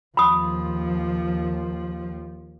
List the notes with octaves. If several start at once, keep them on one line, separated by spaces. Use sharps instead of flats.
D#2 F3 B5 D#6